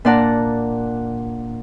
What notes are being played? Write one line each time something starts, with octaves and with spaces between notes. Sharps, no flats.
A#2 D4 D5 F#5 A5 A#5